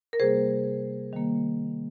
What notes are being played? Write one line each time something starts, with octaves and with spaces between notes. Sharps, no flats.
A#4
C3 G3 A#3 G#4 C5
D#3 G3 A#3